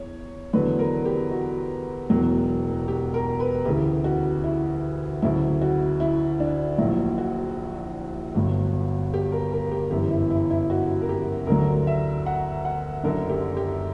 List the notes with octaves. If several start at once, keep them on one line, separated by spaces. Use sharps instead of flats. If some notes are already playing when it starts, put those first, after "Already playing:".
Already playing: E2 C#5
E2 D3 F#3 B4
A#4
G4
F#4
E1 E2 B2 F#3
G4
A#4
B4
D2 C#3 E3 G4
F#4
E4
D2 C#3 F#3 E4
F#4
E4
D4
A#1 A#2 F#3 E4
F#4
G1 G2 F#3
G4
A#4
A#4
G4
G1 F#2 E3 G4
E4
E4
E4
F#4
A#4
G4
D2 D3 F#3 A#4
E5
F#5
F#5
F#1 F#2 D3 A#4
G4
G4